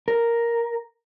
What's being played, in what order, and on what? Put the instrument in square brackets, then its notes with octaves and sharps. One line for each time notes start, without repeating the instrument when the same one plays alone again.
[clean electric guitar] A#4